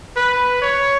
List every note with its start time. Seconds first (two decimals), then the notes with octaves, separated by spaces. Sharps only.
0.16 B4
0.62 C#5